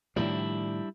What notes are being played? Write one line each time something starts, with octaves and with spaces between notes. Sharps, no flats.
A2 D#3 F3 G3 D4 E4